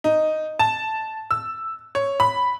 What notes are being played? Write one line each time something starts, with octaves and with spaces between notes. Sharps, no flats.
D#4
A5
E6
C#5
B5